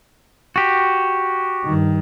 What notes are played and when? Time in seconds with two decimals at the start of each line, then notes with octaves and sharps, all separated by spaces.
0.56 F#4 G4
1.65 G2 D#3